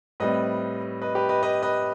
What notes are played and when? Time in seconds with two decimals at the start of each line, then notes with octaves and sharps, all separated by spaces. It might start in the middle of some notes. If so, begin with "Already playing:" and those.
0.20 A2 G3 C4 B4 D#5
1.02 B4 D#5
1.15 G4 B4
1.29 B4 D#5
1.43 B4 D#5
1.63 B4 D#5